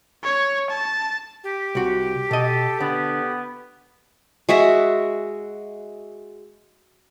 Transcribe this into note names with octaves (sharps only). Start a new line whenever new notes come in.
C#5
A5
G4
C2 F#4
B2 A4 D#5
D3 B3
G#3 F#4 G#4 E5